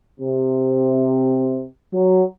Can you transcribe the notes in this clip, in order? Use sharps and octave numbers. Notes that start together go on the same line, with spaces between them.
C3
F#3